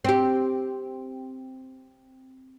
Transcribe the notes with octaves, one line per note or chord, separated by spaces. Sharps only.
C4 G4